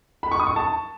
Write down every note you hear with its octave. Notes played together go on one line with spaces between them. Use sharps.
B5
C#6
D#6
C#6
A5